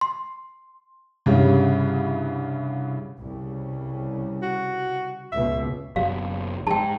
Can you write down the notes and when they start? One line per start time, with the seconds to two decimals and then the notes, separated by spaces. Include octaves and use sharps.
0.01 C6
1.26 C2 G2 C#3
3.21 C2 C#3
4.43 F#4
5.32 C#2 B2 E5
5.96 F#1 B2 F#3 F5
6.67 G#2 G5 A5